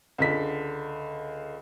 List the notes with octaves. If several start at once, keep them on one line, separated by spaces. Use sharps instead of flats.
C#2 D3 B6